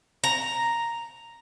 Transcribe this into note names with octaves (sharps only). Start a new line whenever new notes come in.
A#5